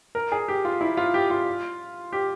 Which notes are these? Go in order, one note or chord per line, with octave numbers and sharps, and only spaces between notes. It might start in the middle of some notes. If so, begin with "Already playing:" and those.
A#4
G#4
G4
F4
E4
F4
G4
F4
G4